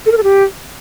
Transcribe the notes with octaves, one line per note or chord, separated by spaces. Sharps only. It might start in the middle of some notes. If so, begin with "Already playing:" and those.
A4
A#4
A4
G4